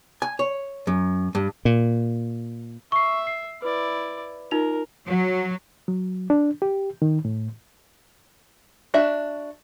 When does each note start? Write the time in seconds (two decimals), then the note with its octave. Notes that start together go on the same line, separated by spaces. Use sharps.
0.22 G#5
0.39 C#5
0.87 F#2
1.35 G2
1.65 A#2
2.92 E5 C#6 C7
3.27 C7
3.62 E4 B4 D5
4.51 D#4 F4 A#4 F7
5.08 F#3
5.88 F#3
6.30 D4
6.62 G4
7.02 D#3
7.25 A2
8.94 D4 F#4 E5